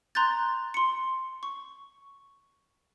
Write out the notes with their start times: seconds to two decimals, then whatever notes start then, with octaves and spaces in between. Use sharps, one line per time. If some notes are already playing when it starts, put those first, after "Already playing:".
0.15 A#5 C6 F#6 G6 A6
0.74 C6 C#7
1.43 C#6